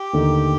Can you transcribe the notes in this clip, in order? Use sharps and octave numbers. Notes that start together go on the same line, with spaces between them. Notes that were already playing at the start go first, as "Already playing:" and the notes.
Already playing: G4
D#2 D3 A3 D#4